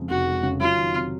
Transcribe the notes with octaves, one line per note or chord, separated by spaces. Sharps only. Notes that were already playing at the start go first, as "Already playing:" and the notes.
Already playing: F2 C#3 G#3
F1 F#4
G#3
C#3
F#3 F4
D#3
C3